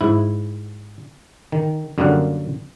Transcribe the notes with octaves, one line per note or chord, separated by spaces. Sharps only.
G#2 E4
D#3
F#2 D3 G3 A#3 F5 F#5